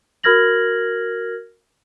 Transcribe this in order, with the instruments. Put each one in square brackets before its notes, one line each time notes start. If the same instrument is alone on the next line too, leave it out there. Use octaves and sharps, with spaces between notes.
[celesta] F#4 A#4 F6 G#6 A#6 F#7